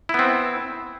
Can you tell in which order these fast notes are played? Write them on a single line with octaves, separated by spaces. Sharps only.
E4 B3 C4